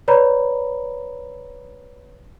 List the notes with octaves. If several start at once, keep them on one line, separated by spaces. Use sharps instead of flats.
B4 C#5 D5 A#5 B5